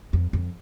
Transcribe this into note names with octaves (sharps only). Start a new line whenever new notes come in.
F2
F2